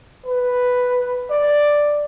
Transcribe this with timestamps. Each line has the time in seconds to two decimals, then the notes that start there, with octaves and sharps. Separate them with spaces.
0.25 B4
1.30 D5